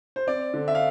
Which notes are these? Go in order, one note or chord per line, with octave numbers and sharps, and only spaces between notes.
C5
C4 D5
D3
E5
F5